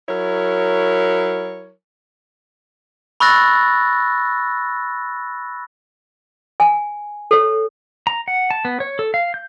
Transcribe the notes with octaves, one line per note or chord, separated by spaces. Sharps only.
F#3 E4 A#4 C#5
B5 C#6 E6 F#6 A6 A#6
G#5
A4 C#5
A#5
F#5
A5
B3
C#5
A4
F5
G6